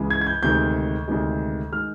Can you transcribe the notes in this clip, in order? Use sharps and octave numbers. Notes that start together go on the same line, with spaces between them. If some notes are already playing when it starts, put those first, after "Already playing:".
Already playing: C#2 C#3 E3 G#3
G#6
G#6
G6
D2 C3 D#3 G#3 G6
D2 C3 D#3 G#3
D#3 G#3 F6